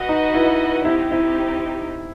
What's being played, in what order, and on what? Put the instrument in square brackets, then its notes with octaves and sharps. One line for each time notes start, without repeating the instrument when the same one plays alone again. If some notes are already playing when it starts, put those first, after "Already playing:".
Already playing: [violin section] F#4 B4 D#5 F#5
[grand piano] D#4
E4
[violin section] C4 D#4 G4 [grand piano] E4
[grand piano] E4